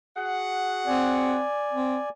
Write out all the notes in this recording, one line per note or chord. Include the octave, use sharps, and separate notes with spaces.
F#4 G#4 F#5
C4 D5 G#5
C4